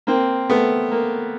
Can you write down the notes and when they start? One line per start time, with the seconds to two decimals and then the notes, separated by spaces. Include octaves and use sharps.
0.07 A#3 C4
0.50 A3 B3
0.91 A#3